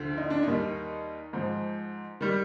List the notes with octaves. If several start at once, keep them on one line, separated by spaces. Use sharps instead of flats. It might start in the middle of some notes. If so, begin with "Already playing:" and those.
Already playing: D2 D3 F3
D#4
D4
D#2 D#3 G3 D#4
G#2 F3
D#3 G3